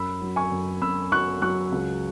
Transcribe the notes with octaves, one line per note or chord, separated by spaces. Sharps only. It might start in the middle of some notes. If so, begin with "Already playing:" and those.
Already playing: F#2 B5 E6
F#3
G#5 C#6
F#2
F#2 B5 E6
F#3 C#6 F#6
F#3 C#6 F#6
C#2